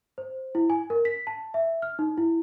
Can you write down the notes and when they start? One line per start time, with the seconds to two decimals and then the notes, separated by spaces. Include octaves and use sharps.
0.18 C5
0.55 E4
0.70 G#5
0.90 A#4
1.05 B6
1.27 A5
1.54 E5
1.82 F6
1.99 D#4
2.17 E4